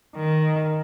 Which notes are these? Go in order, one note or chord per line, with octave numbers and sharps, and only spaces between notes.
D#3